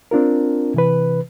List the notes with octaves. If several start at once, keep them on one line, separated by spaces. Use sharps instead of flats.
C4 D4 F4 A#4
C3 E3 B4